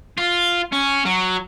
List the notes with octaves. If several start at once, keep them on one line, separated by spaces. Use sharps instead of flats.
F4
C#4
F#3